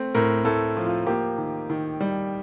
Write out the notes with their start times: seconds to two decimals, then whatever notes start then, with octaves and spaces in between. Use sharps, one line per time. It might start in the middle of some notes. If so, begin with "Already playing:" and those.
Already playing: A3 C4
0.15 A2 A#4
0.45 A2 A4
0.77 F3
0.86 F4
1.07 A#3 G4
1.38 D#3
1.70 D#3
2.01 G3